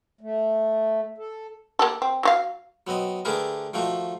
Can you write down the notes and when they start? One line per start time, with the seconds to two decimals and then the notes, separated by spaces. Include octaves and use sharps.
0.21 A3
1.18 A4
1.79 A#3 G4 A4
2.02 C4
2.23 F#3 F4 F5
2.87 F#3 B3 C4 D#5
3.25 D3 A3 G4 G#4 A#4 B4
3.74 D#3 F3 A3 F#4 C5